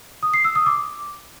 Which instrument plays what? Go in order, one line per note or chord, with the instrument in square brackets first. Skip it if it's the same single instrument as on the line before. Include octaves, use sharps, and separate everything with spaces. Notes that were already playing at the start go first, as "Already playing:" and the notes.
[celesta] D#6
C7
E6
D#6
D6